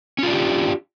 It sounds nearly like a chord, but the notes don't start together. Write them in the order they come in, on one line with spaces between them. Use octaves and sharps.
C#4 F4 D4 G4